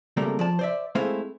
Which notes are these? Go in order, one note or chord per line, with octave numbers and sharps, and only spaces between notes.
C#2 C3 G3 A3 A#3 A#4
F3 D5 A5
C5 D5 E5
G#3 A3 C4 E4 C5 F5